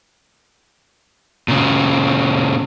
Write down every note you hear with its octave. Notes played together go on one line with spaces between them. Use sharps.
A#2 C#3